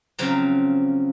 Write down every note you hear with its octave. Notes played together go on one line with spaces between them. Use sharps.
C#3 F3 F#3 C4